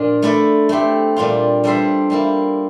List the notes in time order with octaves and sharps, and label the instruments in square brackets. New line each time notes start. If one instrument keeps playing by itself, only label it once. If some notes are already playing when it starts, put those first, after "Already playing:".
Already playing: [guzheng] A#2 F3 D4 F4 A#4
A3 E4 A4 D5
A3 C4 G4
A#2 G3 D4 F4
G3 D4 A4 C5 E5
G3 A#3 E4